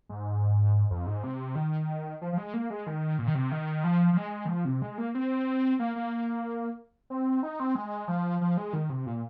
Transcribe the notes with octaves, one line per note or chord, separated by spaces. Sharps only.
G#2
F2
G#2
C3
D#3
F3
F3
G#3
A#3
G#3
D#3
A#2
D#3
C3
D#3
F3
F3
G#3
D#3
F3
C3
G#3
A#3
C4
A#3
A#3
C4
D#4
C4
G#3
F3
F3
G#3
D#3
C3
A#2